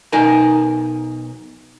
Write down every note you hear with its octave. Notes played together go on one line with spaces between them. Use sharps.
B1 D#4 A#4 G#5